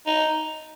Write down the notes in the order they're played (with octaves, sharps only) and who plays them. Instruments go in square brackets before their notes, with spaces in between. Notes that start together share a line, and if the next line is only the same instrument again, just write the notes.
[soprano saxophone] D#4